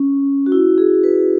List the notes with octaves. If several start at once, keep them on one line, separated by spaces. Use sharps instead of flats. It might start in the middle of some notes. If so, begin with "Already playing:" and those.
Already playing: C#4
F#4
E4
G#4
B4